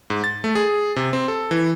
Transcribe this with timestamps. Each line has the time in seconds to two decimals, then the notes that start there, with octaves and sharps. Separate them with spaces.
0.10 G#2
0.24 A6
0.44 A3
0.55 G#4
0.96 C3
1.13 C4
1.28 A4
1.51 E3